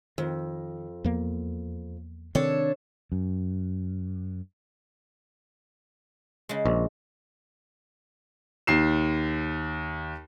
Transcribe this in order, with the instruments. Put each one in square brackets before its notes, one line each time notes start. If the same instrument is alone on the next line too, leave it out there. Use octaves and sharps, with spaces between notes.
[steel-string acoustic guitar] F2 [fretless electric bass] D#3
[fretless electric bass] E2 F3 A#3
[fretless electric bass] C3 D#3 C4 [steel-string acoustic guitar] D4 A4 C#5
[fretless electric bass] F#2
[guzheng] C#3 G#3
[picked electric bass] A#1
[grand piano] D#2 C7 E7